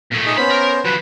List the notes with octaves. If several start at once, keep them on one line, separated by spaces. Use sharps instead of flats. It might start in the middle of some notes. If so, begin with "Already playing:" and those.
A#2 A3
D#4 G#4
B3 C#4 C5 B5
A#4
F3 F#4 B4